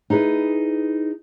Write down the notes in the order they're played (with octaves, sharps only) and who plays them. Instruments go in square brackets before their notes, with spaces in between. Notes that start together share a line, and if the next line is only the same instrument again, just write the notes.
[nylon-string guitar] D#4 E4 G#4 B4